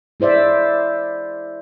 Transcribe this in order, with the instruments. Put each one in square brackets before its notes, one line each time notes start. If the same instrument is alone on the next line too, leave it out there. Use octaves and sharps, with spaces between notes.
[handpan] G#3 E4 C5 D5 E5